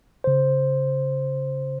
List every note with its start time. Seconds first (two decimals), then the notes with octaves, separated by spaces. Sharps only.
0.24 C#3 C5